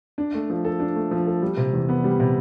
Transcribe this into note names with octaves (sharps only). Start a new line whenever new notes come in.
D4
A3
F3
A4
D4
A3
F3
A4
G3
C3
E2
B3
G3
C3